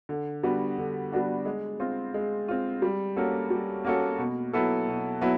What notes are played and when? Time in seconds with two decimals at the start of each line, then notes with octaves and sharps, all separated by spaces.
0.09 D3
0.43 G3 B3 D4 F#4
0.78 D3
1.12 G3 B3 D4 F#4
1.45 G#3
1.80 C4 F4
2.14 G#3
2.48 C4 F4
2.82 G3
3.16 A#3 C#4 F#4 A4
3.50 G3
3.85 A#3 C#4 F#4 A4
4.18 B2
4.53 F#3 B3 E4 A4
4.87 B2
5.21 F#3 B3 E4